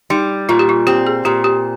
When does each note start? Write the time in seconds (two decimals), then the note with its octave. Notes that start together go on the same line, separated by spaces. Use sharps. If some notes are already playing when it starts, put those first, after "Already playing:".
0.10 G3 D#4
0.49 A#2 F4
0.59 G4
0.69 F4
0.87 C4 G4
1.07 G#4
1.25 A#2 G4
1.44 G4